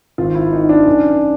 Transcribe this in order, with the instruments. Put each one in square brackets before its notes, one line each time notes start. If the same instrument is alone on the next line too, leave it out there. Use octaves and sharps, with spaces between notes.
[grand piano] G#1 F4
E4
D#3 D#4
D4
F#2